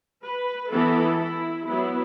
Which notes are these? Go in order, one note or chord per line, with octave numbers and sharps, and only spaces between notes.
B4
E3 B3 E4 A4
E4
F#3 B3 E4